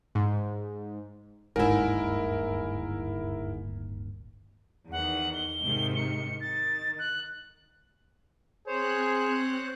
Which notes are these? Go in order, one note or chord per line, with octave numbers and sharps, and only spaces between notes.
G#2
D1 G1 D#2 G#2 E4 A#4 E5
E2 D#3 F#5
G7
G#2 C3 D#3
C#7
D#3 A6
F#6
C4 G#4 C5 C#5 F#6